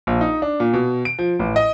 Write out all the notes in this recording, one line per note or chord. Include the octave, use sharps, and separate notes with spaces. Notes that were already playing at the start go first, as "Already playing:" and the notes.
A#1
D#4
D4
A#2
B2
D7
F3
A1
D#5